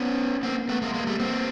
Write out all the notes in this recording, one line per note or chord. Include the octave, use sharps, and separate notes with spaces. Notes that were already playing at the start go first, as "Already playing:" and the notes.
Already playing: B3 C#4
A#3 C4
A3 B3
G#3 A#3
G#3 A#3
G3 A3
A#3 C4